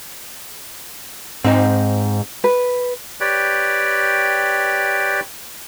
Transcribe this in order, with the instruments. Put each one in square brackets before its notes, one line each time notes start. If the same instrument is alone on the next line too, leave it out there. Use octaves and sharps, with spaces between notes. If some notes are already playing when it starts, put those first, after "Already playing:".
[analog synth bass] G#2 [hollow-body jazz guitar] C4 D#4
[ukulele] B4
[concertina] G4 B4 C#5 D5 G5